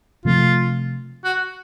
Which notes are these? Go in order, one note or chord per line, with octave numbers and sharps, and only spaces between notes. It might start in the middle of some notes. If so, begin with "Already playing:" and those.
C3 F3 A3 F4
F#4